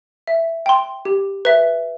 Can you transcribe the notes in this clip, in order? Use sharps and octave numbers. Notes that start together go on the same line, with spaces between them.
E5
G5 C6
G4
B4 E5